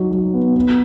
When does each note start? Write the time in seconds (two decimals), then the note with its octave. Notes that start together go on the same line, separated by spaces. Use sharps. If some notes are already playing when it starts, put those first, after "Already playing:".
Already playing: F#3 D#4
0.11 F#3
0.34 B3
0.56 B3